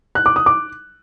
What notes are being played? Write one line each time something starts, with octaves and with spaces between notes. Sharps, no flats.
F#6
D6
D#6
D6